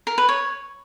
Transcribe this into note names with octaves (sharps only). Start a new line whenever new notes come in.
A#4
B4
C#5